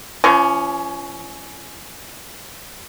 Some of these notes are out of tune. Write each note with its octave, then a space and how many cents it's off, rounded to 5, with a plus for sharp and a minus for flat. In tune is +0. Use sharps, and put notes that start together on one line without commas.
F3 -40 C#4 +10